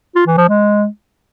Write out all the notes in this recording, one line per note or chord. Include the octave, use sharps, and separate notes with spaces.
F4
E3
F3
G#3